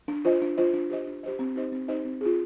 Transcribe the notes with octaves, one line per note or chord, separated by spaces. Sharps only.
D4
F4 C5 D#5
D4
F4 C5 D#5
D4
G4 C5 D#5
D4
G4 C5 D#5
C4
D#4 G4 C5 D#5
C4
D#4 G4 C5 D#5
C4
F4 G#4